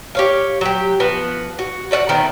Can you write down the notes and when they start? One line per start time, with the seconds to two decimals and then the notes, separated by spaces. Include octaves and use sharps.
0.15 G4 C#5 F5
0.61 F#3 G4
1.00 F3 B3 F#4
1.59 F#4
1.91 F#4 D5 E5 F#5
2.09 D#3 A3 B3 C4